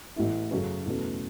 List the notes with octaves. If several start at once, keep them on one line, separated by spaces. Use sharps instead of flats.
A1 A2 E3 A3 E4
F#2 C#3 F#3 A3 C#4
E2 B2 F#3 A3 C#4